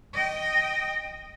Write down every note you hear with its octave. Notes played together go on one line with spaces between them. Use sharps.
D#5 G5